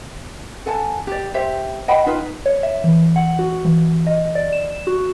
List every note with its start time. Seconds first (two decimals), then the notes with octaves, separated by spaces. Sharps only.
0.66 A4 F#5 G#5 A5
1.07 G4 D5
1.34 G4 C5 E5
1.88 D#5 F#5 G5 B5
2.06 D#4 F4 B4
2.46 C#5
2.63 E5
2.84 E3
3.16 F#5
3.39 F#4
3.65 E3
4.07 D#5
4.35 D5
4.53 E7
4.87 F#4